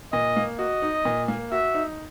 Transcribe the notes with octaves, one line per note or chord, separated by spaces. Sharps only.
A#2 D#5
A#3
F#4 D#5
D#4
A#2
A#3
F#4 E5
D#4